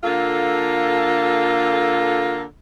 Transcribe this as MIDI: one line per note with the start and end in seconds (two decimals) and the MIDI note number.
0.04 2.43 50
0.04 2.43 58
0.04 2.43 65
0.04 2.43 69